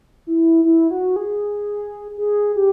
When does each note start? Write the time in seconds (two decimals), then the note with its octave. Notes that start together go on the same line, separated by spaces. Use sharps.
0.27 E4
0.65 E4
0.91 F#4
1.16 G#4
2.18 G#4
2.56 G4